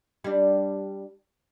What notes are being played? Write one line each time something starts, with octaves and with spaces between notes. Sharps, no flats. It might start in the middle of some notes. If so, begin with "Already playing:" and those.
G3 D4